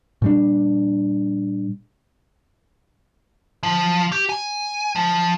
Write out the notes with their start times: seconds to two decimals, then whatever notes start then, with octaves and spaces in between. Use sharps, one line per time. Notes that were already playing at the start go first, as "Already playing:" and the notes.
0.22 A#2 G3 D4
3.63 F3
4.12 G4
4.29 G#5
4.96 F3